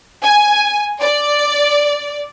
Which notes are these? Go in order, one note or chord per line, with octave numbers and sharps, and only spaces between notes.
G#5
D5